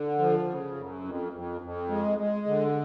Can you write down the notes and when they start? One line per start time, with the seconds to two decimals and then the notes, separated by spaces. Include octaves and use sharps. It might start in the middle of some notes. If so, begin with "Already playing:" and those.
Already playing: D3
0.19 F3
0.47 C#3
0.76 F#2
1.04 F2
1.33 F2
1.61 F2
1.89 G#3
2.18 G#3
2.46 D3